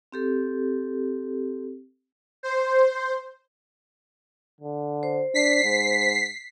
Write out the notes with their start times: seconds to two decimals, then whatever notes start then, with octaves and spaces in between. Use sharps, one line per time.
0.12 C4 G4 A4
2.43 C5
4.61 D3
5.03 C5
5.34 D4 B6 C7
5.64 G#2